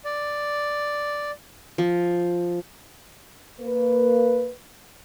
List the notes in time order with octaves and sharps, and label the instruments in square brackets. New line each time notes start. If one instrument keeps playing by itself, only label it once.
[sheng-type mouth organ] D5
[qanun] F3
[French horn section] A#3 B4